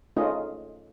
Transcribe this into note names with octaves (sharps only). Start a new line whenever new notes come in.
A3 C#4 D#4 F4 G#4 D#5